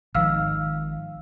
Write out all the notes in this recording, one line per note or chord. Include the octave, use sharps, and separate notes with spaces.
G#1 D#3 F3 F5 E6 F6